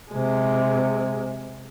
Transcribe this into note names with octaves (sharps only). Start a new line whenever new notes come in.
C3 G#3